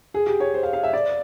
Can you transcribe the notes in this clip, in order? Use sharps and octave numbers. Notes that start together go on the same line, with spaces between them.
G#4
G4
C#5
C5
F5
F5
E5
D5